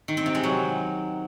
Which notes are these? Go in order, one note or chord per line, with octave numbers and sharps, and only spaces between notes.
D#3
C4
C3
G#3
F#3